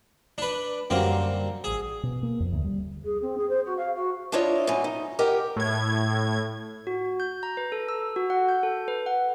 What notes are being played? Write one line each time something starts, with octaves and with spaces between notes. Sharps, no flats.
D4 B4
F#2 D3 F#3 G3 A#3 C4
A1 G#4 E6
B2
A#3
F2
D2
G3
G#4
C4
G#4
C5
F#4
F5
F#4
D4 E4 F4 C#5 D#5
A2 D3 F#3 D#4 G#5
D#4
G4 A#4 D#5 F#5 G5
A2 G#6
F#4
G6
A#5
B4
A4
E6
F#4
F#5
G6
A4
B4
F#5